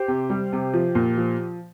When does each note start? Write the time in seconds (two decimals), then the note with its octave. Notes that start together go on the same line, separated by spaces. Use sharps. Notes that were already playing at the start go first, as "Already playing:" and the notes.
Already playing: G4 C5
0.08 C3
0.30 G3
0.53 C3
0.73 F3
0.95 A#2
1.17 F3